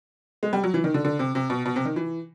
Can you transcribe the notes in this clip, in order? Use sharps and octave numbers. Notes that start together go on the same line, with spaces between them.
G#3
G3
F#3
E3
D#3
D3
D3
C3
C3
B2
B2
C3
D#3
E3